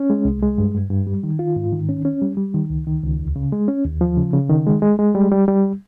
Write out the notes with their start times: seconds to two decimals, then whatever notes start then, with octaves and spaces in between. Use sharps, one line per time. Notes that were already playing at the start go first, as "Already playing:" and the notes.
Already playing: C#4
0.10 G#3
0.25 C2
0.42 G#3
0.58 G2
0.75 G2
0.90 G2
1.07 G3
1.24 D#3
1.39 F4
1.56 G#2
1.72 D#3
1.89 C#4
2.05 C#4
2.22 G3
2.37 G3
2.54 D#3
2.70 C#2
2.87 D#3
3.03 C#2
3.19 D#2
3.36 C#3
3.52 G#3
3.68 C#4
3.84 D#2
4.01 F3
4.17 C#3
4.33 C#3
4.50 D#3
4.66 G#3
4.82 G#3
4.99 G#3
5.15 G3
5.32 G3
5.48 G3